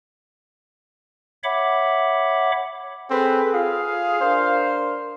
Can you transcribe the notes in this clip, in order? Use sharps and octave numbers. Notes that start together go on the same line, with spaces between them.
C#5 E5 F#5 B5 D6
C4 G#4 A4 B4
F4 G#4 F5
D4 A#4 C5